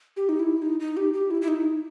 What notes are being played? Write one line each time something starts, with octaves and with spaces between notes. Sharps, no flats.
G4
D#4
E4
D#4
D#4
G4
G4
E4
E4
D#4